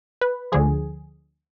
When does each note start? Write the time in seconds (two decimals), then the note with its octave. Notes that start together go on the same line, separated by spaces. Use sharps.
0.21 B4
0.52 D2 D3 F3 G#4